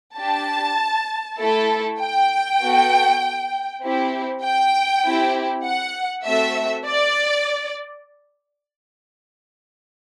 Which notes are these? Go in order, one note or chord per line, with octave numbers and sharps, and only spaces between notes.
D4 G4 A5
A3 E4 A4
G5
B3 F#4 A4
C4 E4 G4
G5
C4 E4 G4
F#5
A3 C4 F#4 A4 E5
D5